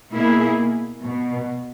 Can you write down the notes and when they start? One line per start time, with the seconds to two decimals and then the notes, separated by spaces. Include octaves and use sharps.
0.12 B2 A#3 E4 G#4
1.03 B2